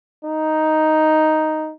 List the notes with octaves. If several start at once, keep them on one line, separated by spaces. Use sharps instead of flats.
D#4